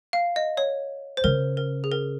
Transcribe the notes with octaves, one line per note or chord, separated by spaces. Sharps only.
F5
D#5
C#5
C5
C#3 A#4
A#4
G#4
A#4